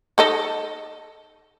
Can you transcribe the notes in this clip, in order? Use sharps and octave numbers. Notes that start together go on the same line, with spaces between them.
D#4 A4 D#5